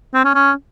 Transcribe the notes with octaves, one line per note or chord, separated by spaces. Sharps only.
C4
C#4
C#4